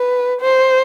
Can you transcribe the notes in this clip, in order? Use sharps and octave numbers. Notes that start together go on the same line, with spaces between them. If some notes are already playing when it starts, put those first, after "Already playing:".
Already playing: B4
C5